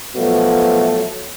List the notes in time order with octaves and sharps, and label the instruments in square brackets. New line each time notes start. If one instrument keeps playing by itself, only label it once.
[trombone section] B2 F3 F#3 A3